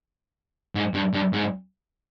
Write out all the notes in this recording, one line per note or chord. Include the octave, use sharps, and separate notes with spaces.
G#2
G2
G2
G#2